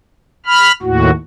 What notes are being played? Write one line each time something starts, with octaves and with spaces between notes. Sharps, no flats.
B5 F6
D#2 A2 F#4